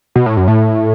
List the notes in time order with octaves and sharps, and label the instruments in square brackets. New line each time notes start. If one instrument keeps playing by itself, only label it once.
[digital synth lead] B2
A2
F#2
A2